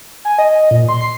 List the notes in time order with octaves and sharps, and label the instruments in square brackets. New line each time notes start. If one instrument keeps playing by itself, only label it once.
[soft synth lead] G#5
D#5
A#2
C6
C7